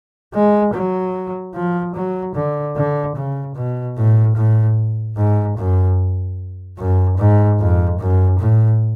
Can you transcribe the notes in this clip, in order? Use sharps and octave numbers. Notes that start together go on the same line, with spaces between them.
G#3
F#3
F3
F#3
D3
D3
C#3
B2
A2
A2
G#2
F#2
F#2
G#2
F2
F#2
A2